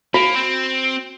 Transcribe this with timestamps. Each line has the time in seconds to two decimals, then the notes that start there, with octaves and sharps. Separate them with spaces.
0.14 A#3 F#4
0.36 C4